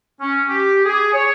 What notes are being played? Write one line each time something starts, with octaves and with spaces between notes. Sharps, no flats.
C#4
G4
G#4
C#5